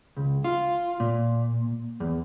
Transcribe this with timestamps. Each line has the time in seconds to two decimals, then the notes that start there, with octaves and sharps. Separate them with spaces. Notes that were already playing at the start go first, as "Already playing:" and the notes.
0.17 C#2
0.44 F4
1.00 A#2
2.00 E2